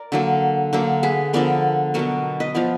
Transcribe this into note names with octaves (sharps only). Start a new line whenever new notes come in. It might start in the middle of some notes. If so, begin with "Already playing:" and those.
Already playing: A#4 D5
D3 F#3 A#3
D3 F#3 A#3
G#4 B4
D3 F3 B3 A#4 D5
B2 F#3 B3 F#4 A#4
B4 D#5
F3 B3 D5 F5